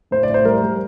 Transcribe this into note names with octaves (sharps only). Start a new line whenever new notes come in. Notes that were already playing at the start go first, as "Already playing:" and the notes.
A2 C5
D5
A2 C5
G3 A#4
G3